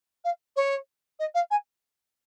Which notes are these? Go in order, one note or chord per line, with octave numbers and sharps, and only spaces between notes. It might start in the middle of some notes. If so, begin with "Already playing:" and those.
F5
C#5
D#5
F5
G#5